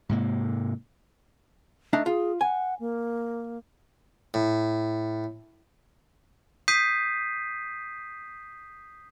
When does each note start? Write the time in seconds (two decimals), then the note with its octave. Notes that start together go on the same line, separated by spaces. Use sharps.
0.09 G#2 C3 A#3
1.93 A3 D4 D#4
2.06 F4 G#4
2.41 F#5 G#5
2.80 A#3
4.34 A2
6.68 D#6 G6 B6 C7 D#7